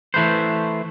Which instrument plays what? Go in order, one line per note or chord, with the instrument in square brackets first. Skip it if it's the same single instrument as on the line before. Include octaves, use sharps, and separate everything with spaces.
[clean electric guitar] E3 A3 B4 C5